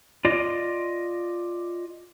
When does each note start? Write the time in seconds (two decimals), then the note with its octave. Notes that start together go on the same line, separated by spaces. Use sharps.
0.25 F4 D5 D#5